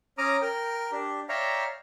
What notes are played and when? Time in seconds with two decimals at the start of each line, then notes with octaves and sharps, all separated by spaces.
0.18 C#4 A#5 D6 D#6 F6
0.42 A#4 G5
0.92 D4 G4
1.29 C#5 D5 E5 F5 G5 A#5